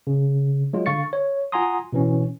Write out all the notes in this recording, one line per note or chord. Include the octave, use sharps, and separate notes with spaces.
C#3
F#3 G#3 F4
D3 F5 C#6 A6 C#7
C#5
F4 F#5 G#5 A#5 C6 D#6
B2 E3 C#4